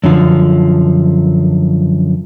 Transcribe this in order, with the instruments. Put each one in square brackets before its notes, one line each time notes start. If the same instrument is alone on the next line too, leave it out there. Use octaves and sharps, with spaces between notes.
[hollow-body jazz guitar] F#2 D3 F3